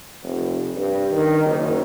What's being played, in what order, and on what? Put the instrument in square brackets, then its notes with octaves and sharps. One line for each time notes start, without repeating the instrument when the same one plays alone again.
[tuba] F1
G2
D#3
F#1